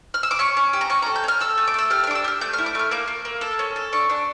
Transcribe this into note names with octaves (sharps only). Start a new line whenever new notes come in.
F6
E6
D6
C#4 C#6
C#4
G4
A#5
C#4 C#6
A#5
A4
G6
C#4 F6
A4 E6
A3
D6
A4 E6
G4 F6
F6
D4 D6
E6
G4 F6
A3 G6
F6
E4
D6
A3 F6
A#3 D6
A#3
A#3
A4 E6
C#4
A4
D4 C#6
D4